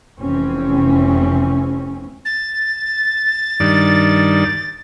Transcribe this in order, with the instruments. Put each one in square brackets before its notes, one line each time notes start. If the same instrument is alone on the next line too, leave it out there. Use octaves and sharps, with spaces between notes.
[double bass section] F1 E3 C4 C#4
[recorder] A6
[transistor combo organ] G2 D#3 D5